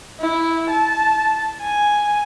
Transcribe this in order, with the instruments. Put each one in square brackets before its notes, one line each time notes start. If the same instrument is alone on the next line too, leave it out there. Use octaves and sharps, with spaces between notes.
[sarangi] E4
A5
G#5